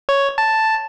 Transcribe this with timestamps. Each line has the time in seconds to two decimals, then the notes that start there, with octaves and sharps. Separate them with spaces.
0.09 C#5
0.38 A5